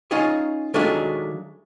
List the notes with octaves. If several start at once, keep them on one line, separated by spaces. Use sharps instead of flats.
C#4 D#4 F4 G#4 C#5 D#5
D#3 F#3 G#3 A3 D4 F4